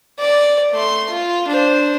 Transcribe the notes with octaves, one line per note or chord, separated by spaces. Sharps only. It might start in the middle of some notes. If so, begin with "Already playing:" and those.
D5
A3 C6
F4
D4 C5